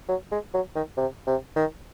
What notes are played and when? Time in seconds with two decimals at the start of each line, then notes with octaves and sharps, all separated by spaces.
0.09 F#3
0.32 G#3
0.54 F#3
0.75 D#3
0.97 C3
1.27 C3
1.56 D#3